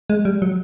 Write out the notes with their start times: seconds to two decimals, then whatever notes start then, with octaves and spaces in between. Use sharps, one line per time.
0.10 G#3
0.25 G3
0.42 F#3